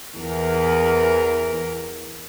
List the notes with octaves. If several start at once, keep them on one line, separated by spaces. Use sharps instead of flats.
E2 E3 A#4